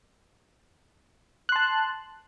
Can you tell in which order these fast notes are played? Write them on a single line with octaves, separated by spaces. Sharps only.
F#6 C6 A5